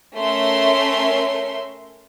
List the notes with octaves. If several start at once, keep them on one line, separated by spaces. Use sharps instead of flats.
A3 C#4 A#4 E5 C6